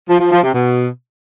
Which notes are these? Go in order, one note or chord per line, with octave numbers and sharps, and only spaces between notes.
F3
F3
F3
C3
B2